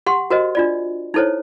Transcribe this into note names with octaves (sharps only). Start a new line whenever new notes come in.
G4 F#5 C6
F#4 A#4 C5 D#5
D4 F4 D5
D#4 E4 A4 C5 C#5